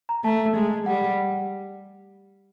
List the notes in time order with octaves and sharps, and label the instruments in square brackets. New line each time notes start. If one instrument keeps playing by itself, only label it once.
[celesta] A#5
[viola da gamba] A3 [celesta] A5
[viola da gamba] G#3
[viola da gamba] G3 [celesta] F#5